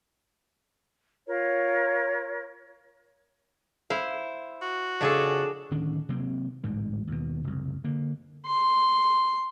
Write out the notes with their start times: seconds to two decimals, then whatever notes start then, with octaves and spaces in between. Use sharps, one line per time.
1.26 F4 A#4 C#5
3.90 E4 C5 F5
4.62 F#4
5.01 F2 C#3 D4 G#4 A4
5.71 D1 D#3 C#4 D4
6.09 C3 F#3 A#3 C4
6.64 A1 D2 G#2 G3
7.07 D#2 B2
7.44 F#1 C2
7.84 D3 A#3
8.46 C6